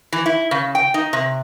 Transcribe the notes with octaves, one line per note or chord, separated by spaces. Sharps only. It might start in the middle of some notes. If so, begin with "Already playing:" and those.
E3
E4
C#3
G5
D#4
C3